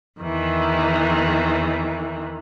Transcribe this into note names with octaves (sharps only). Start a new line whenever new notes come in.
E2 D#3 E3